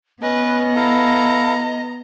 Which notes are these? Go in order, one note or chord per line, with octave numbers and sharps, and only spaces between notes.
B3 C#4 B4 D#5
E4 A4 F5 A#5